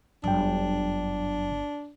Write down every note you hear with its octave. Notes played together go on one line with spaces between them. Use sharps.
G1 F#2 F#3 D4 G5